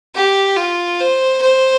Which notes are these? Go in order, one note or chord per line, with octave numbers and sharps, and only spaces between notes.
G4
F4
C5
C5